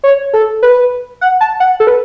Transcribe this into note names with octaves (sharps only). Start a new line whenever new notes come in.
C#5
A4
B4
F#5
A5
F#5
A4
B4